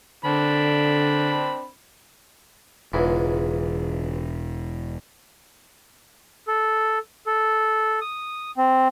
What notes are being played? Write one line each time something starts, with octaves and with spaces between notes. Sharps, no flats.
D3 C4 D4 B5
E1 C#2 G#2 E3
A4
A4
D#6
C4